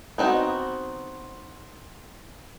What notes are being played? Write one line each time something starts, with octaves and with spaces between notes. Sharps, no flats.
B3 C4 D#4 F#4